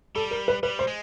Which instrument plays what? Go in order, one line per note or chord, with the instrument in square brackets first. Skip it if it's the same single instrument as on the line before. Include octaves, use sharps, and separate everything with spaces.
[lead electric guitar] G3 [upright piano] A4
[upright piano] A#4
B4
[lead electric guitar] G3 [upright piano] B4
[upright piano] C5
[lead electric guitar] G#3